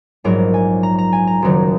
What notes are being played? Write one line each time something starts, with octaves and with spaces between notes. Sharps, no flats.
A#1 G#2 F#3 A#4
G#5
A#5
A#5
G#5
A#5
F#1 F#2 D#3 F#3